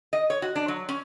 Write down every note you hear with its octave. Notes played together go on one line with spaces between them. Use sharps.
D#5
C#5
F#4
D4
F#3
C#4